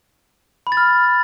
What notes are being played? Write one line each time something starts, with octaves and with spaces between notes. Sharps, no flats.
B5
A6
F6